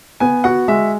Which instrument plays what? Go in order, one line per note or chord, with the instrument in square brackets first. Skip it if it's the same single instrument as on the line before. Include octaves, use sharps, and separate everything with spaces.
[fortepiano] B3 [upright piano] G#5
[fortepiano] F#4 [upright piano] F#5
[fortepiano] G#3 [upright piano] E5